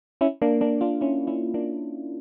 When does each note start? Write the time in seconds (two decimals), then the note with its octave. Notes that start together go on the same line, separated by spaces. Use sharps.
0.21 C#4 E4
0.42 A#3 D4
0.61 A#3 D4
0.81 D4 F4
1.01 C#4 E4
1.27 C#4 E4
1.54 A#3 D4